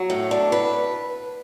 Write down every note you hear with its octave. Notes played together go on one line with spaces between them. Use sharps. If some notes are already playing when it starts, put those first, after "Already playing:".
Already playing: F#3
A2
D4
B4